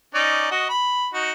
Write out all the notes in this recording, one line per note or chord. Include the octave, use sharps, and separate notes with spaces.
C#4 D#4 D5
F#4 D#5
B5
D#4 F#4